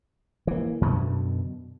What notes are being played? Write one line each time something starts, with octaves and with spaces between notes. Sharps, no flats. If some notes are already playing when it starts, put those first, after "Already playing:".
E3 A#3
F#2 B2 D3